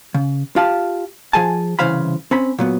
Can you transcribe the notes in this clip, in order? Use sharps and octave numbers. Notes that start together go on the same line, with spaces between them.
C#3
F4 G4 F5 A5
F3 G#4 G#5 A5
C2 C#3 E3 C5 F5 B5
C4 C#4 B5
A#2 F#3 B3